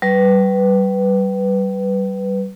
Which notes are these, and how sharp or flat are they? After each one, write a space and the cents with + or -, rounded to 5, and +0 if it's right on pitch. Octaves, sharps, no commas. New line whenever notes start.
G3 -30 B4 +5